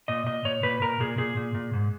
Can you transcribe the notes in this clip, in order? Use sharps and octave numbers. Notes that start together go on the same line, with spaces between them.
A#2 D#5
A#2 D#5
A#2 C#5
A#2 B4
A#2 A#4
A#2 G#4
A#2 G#4
A#2
A#2
G#2